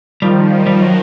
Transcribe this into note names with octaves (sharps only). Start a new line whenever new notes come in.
D#3 F3 G3
G3
F#3